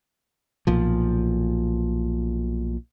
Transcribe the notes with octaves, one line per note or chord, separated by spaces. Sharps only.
B1 A#2 F3